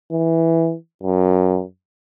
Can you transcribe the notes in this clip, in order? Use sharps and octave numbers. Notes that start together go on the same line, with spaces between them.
E3
F#2